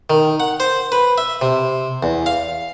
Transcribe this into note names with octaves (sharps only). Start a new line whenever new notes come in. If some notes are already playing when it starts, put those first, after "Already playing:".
D#3
F#5
C5
B4
E5
C3
E2
F5